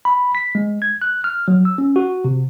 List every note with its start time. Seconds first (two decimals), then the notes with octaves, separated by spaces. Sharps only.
0.05 B5
0.35 B6
0.55 G#3
0.82 G#6
1.02 F#6
1.24 F6
1.48 F#3
1.65 E6
1.78 C#4
1.96 F#4
2.25 C3